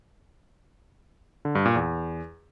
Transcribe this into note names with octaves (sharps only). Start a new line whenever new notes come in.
D3
G2
A#2
E2